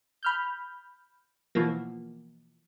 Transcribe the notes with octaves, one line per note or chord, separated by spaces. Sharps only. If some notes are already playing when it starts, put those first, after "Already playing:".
B5 F6 G6
B2 E3 F3 A#3